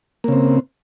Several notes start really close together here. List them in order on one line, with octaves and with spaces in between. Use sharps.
A#3 C#3 C4